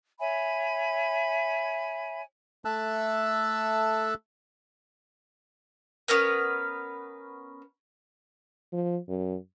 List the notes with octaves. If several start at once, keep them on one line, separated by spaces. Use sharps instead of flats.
C#5 E5 G#5 B5
A3 A4 E5 A5 E6 F#6
B3 C#4 A#4 B4
F3
F#2